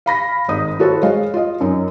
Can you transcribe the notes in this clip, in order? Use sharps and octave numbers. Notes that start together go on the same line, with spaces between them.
F5 B5 A#6 B6
G#1 D#4 D#6
E4 F#4 A4 C5 C#5
G#3 C#5 D#5 F5
F4 D#5
F#2 C#4 D#4